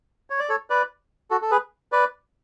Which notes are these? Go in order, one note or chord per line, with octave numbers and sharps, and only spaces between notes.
C#5
D5
A4 C#5
B4 D5
F#4 A4
A4
G#4 B4
B4 D5